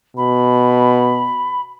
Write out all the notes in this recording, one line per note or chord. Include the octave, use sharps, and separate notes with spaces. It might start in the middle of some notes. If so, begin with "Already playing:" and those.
B2 B5